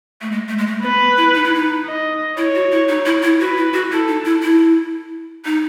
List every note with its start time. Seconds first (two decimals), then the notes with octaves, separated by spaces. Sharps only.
0.21 A3
0.32 G#3
0.48 A3
0.58 G#3
0.67 A3
0.83 B3 B4
1.00 B3
1.17 E4
1.35 D#4
1.44 E4
1.54 D#4
1.86 D#5
2.37 E4 C#5
2.55 F#4
2.72 E4
2.89 D#4
3.06 E4
3.22 E4
3.40 F#4 B4
3.57 E4
3.74 F#4
3.91 E4 A4
4.08 D#4
4.25 E4
4.43 E4
5.45 D#4